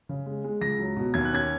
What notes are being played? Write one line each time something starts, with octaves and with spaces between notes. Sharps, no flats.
C#3
G#3
G#3
C#2 A#6
F#3
B2
D#2 G#6
F#6
C#4 G#6